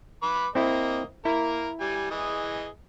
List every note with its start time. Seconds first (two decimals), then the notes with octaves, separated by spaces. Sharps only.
0.23 B4 B5 D6
0.55 A#3 C4 E4 D#5
1.25 A#3 E4 A#4
1.80 G3 G#5
2.10 E3 G#4 D#5